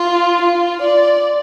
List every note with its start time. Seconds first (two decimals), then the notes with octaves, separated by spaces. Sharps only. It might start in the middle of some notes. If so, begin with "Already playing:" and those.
Already playing: F4
0.42 F4
0.82 D5